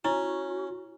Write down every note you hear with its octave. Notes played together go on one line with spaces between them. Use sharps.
C#4 E4 F#4